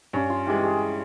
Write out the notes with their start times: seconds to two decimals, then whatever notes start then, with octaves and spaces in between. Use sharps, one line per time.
0.13 G2 C#4
0.30 F4
0.47 E3 G#3 G4
0.63 G#4